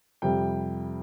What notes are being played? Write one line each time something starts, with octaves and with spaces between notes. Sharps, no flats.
F2 C3 G3 G5